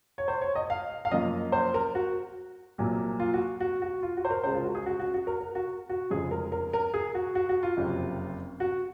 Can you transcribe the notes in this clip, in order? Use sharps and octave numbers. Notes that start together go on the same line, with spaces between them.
C#5
C5
C#5
D#5
F5
F5
F#2 F3 A#3 D#5
C5
A#4
F#4
C2 A#2 F#3 A#3
F4
F#4
F#4
F#4
F4
F#4
C5
A#4
C#2 C#3 G#3 C5
F4
F#4
G#4
F#4
F#4
F#4
A#4
A#4
F#4
F#4
F1 F2 C#3 F3 G#3 G#4
A#4
A#4
A#4
G#4
F#4
F#4
F#4
F4
F#1 F2 C3
F#4